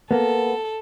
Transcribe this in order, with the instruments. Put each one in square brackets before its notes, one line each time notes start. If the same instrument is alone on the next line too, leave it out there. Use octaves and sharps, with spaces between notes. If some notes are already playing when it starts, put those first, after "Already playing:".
[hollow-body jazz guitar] A#3 B3 [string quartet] A4